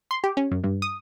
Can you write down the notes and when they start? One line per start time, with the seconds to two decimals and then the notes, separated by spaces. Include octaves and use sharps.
0.11 C6
0.24 G4
0.37 C#4
0.51 F#2
0.64 G2
0.82 D#6